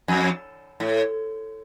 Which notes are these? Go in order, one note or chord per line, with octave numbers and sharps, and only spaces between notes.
F2
A2